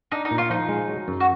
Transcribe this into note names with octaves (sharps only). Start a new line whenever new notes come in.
D4 D#4
D#4
A#2
F4
F3 D#4
G#3
F#3
F#2
F#4